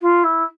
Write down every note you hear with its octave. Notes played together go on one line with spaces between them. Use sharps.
F4
E4